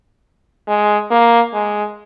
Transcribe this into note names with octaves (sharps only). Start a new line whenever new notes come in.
G#3
A#3
G#3